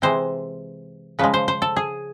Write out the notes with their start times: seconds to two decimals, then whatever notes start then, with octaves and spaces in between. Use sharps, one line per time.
0.02 C3 E3 G#3 C5
1.19 C#3 F3 G#3 B4
1.34 C5
1.48 C5
1.62 A4
1.77 G#4